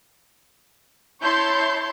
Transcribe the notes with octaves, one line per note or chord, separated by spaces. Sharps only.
E4 C#5 A5 C6 G6